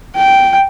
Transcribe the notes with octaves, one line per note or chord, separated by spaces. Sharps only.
G5